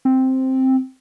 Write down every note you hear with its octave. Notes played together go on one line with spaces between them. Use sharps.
C4